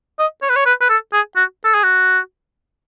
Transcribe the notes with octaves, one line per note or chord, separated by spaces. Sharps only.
D#5
C#5
B4
C#5
B4
B4
A4
G#4
F#4
A4
G#4
F#4